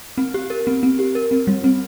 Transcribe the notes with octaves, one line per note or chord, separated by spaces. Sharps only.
C4
G4
A#4
C4
C4
G4
A#4
C4
G3
C4